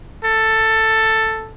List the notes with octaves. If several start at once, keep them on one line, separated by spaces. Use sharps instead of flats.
A4